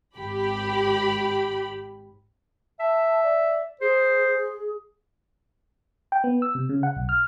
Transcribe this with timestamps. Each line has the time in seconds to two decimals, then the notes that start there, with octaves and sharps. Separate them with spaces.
0.18 G#1 G4 B5
2.80 E5 A5
3.23 D5
3.81 G#4 C5
6.12 G5
6.24 B3
6.42 E6
6.55 C3
6.69 C#3
6.83 F#5
6.96 B1
7.09 F6